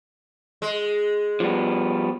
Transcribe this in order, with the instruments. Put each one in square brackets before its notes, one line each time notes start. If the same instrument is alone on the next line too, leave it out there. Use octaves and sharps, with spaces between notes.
[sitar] G#3
[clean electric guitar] F3 G3 B3